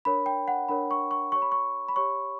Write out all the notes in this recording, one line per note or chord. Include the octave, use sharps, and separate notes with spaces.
D4 A#4 C#5 B5
G5
F#5
D4 A#4 C#5 B5
C#6
C#6
G4 C#5 C#6
B5
C#6
B5
G4 C#5 C#6